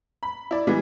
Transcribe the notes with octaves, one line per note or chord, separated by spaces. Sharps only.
B5
E4 D5
E3 G3 G#3 B3